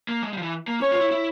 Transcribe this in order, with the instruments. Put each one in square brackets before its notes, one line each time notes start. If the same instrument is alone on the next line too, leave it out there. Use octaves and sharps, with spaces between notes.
[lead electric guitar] A#3
G#3
G3
F3
E3
A#3
[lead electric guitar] C#4 [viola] C#5
[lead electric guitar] F4
E4
E4